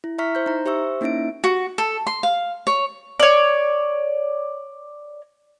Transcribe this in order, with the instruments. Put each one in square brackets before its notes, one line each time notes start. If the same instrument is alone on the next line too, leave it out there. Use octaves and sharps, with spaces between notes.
[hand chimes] E4
E4 E5 A#5 C#6 F6 B6
C5 G6
D#4 A#5
G4 C5 E5 C#6 E6
A#3 C#4 D#4 E4 E5 D7
[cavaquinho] F#4
A4
C6
F5
C#5
[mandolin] C#5 D5